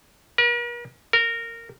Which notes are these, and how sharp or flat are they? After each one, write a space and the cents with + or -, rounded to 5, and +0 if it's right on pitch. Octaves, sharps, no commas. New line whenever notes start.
A#4 +45
A#4 -15